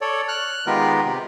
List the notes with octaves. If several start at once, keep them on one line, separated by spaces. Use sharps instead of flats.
A4 C#5 D5
F6 F#6
D#3 G#3 B3 F4 G4 A#4
C3 G4